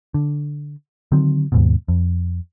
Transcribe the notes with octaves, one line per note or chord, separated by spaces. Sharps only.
D3
D3 D#3 F#3 C4
D#2 G#2 B2
F2